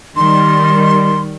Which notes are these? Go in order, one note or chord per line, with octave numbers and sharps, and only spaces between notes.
D#3 G3 C6